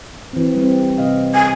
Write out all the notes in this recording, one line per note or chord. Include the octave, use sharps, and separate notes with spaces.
E3 C4
G3 C4
C3 D#5 F5
G#5